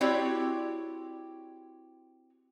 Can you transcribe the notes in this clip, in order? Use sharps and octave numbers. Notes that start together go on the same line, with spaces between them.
C4 E4 F#4 G4 C#5 D5